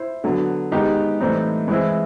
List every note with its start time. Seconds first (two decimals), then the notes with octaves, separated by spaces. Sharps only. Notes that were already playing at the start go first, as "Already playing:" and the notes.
Already playing: E4 C5
0.24 D3 F#3 B3
0.72 D#3 G#3 B3 D#4 G4
1.21 A2 E3 G3 C4 D#4
1.68 E3 G#3 C4 E4 G#4